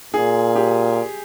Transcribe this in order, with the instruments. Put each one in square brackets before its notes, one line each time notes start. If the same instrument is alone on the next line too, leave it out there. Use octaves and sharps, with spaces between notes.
[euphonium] A#2 [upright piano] G#4
[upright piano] G4